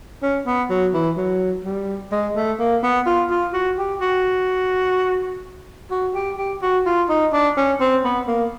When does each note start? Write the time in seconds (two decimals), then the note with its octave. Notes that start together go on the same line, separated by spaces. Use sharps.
0.23 C#4
0.46 B3
0.70 F#3
0.94 E3
1.17 F#3
1.64 G3
2.12 G#3
2.36 A3
2.59 A#3
2.83 B3
3.06 F4
3.30 F4
3.53 F#4
3.78 G4
4.01 F#4
5.91 F#4
6.15 G4
6.38 G4
6.62 F#4
6.86 F4
7.09 D#4
7.33 D4
7.57 C#4
7.80 C4
8.04 B3
8.27 A#3